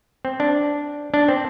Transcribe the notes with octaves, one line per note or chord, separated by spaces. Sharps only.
C4
D4
D4
C4